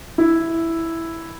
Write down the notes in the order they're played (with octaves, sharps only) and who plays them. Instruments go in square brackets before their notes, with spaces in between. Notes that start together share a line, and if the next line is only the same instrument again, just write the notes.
[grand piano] E4